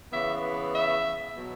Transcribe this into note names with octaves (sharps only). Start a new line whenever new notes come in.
C#3 E3 B3 E5
E5
B2 F#3 B3